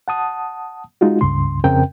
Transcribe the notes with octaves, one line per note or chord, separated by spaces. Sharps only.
F#5 A5 D#6
G#3 D#4 F4 F#4
C#2 G2 C#3 C6
F2 C#3 C4 A#4 G5